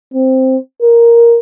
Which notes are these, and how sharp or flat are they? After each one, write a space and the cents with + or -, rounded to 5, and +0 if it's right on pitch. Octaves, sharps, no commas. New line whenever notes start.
C4 +0
A#4 +5